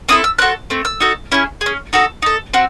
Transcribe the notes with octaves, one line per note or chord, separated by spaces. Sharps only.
C4 E4 A4 D#6
E6
C4 F#4 A4 F#6
A3 C4
E6
D#4 F#4 A4
C#4 E4 G#4
G#4
C#4
D#4 F#4 A4
D#4 A4
C4 F#4